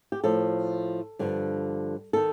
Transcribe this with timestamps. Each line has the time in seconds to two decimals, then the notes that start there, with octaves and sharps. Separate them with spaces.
0.12 G4
0.24 A2 F3 A4
1.19 G2 D3 F3
2.13 D#3 A4